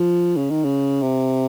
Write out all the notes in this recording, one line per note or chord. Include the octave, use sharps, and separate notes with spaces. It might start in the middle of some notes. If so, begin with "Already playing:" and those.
Already playing: F3
C#3
D#3
C#3
C3